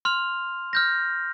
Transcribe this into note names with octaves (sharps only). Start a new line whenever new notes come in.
C6 F6 F7
F6 G6 A#6